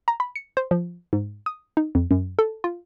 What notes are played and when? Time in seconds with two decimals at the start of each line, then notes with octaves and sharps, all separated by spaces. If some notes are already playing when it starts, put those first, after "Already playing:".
0.08 A#5
0.20 B5
0.36 C#7
0.57 C5
0.71 F3
1.13 G#2
1.46 D#6
1.77 D#4
1.95 F2
2.11 F#2
2.39 A4
2.64 F4